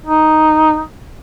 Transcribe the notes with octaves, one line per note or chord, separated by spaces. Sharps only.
D#4